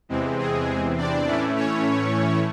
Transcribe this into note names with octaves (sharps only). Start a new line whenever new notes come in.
E2 C3 E3 G#3 C4
G#3 G#4
D4 D5
A2 E3 A3 C#4 E4
C#4 C#5